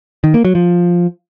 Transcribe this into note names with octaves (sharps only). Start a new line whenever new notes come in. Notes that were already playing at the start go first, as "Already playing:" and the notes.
D#3
A#3
F#3
F3